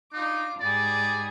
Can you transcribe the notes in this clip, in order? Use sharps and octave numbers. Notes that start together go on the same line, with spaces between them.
D4 D#4 F4 D6
G#2 G3 G#4 D5